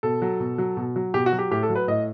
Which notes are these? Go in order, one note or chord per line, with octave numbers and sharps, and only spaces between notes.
B2 A4
F#3
B2
F#3
B2
F#3
B2 G4
F#4
F#3
G4
A2 G4
A4
F#3
B4
A2 D#5